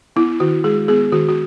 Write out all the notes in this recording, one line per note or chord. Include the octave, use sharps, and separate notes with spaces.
B3 E4
D#3 F#4
G#3 G#4
B3 G#4
D#3 F#4
F#4